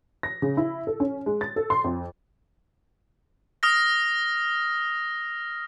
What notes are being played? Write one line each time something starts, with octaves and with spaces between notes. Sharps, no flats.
A#6
C#3
E4
A4
C#4
G#3
A6
A4
C6
F2
D#6 F6 A#6